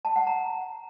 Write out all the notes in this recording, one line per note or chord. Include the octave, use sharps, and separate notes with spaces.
A5
F#5
A#5